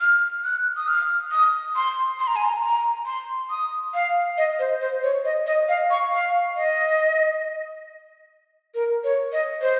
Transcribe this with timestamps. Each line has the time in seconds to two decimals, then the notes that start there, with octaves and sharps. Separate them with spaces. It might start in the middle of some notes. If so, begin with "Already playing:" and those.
0.01 F6
0.44 F#6
0.77 D#6
0.88 F6
1.31 D#6
1.76 C6
2.19 C6
2.27 A#5
2.36 G#5
2.45 A#5
2.63 A#5
3.06 C6
3.50 D#6
3.94 F5
4.38 D#5
4.59 C5
4.81 C5
5.03 C#5
5.25 D#5
5.46 D#5
5.69 F5
5.91 C#6
6.13 F5
6.57 D#5
8.75 A#4
9.04 C#5
9.33 D#5
9.62 C5